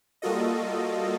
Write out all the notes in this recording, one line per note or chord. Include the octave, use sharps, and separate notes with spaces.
G3 A#3 F4 F#4 A4 D#5